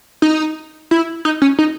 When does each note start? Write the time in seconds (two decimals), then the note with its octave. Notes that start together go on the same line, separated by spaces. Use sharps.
0.22 D#4
0.91 E4
1.25 D#4
1.42 C#4
1.59 D#4